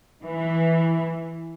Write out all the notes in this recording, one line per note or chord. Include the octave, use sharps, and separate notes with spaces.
E3